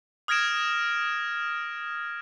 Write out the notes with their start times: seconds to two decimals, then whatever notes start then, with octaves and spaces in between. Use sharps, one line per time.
0.28 D#6 F6 G#6 A#6 D7 E7